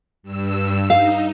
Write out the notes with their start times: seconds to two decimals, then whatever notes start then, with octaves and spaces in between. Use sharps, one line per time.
0.23 G2 E6
0.90 D#4 F5